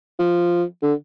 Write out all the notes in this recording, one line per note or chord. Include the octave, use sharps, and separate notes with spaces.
F3
D3